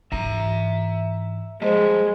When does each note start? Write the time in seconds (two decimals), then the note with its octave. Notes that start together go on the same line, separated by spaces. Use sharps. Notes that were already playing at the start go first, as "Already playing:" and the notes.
0.12 G#2 E3 E5 A#5
1.62 F3 G3 G#3 C5 D#5